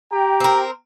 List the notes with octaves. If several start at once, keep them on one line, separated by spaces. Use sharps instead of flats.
G4 G5 A#5
C4 A#4